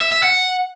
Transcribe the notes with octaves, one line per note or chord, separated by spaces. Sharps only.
E5
E5
F#5